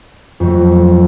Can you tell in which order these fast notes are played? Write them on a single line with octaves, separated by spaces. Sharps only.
F2 F#3 A3